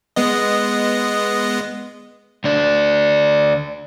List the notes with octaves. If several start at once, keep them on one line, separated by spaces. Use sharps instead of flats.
G#3 B3 D#5
D2 D4